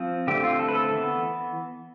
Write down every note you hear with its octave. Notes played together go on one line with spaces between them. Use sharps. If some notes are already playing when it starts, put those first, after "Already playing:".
Already playing: F3 C4
D3 A3 C4 G4
F4
A4
B4
A4
E3 B3